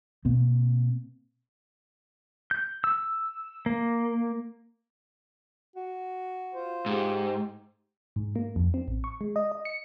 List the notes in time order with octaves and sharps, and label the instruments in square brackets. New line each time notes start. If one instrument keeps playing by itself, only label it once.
[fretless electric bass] B2 A#3 C4
[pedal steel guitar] G6
E6
A#3
[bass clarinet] F#4
[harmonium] F4 C5
[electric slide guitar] G#2 [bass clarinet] G4
[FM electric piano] G#2
A#3
F2
C4
A1
C#6
G#3
D#5
D#5
C#7